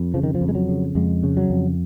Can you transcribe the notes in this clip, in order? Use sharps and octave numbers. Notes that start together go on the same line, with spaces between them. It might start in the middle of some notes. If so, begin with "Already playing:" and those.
Already playing: F2
C#3 F3
D#3
F3
F2
G#3
F#3
C#3
F2 G#3
C#3
F#3
F2